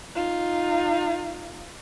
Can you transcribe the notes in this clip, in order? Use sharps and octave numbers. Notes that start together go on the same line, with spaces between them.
D#4 F4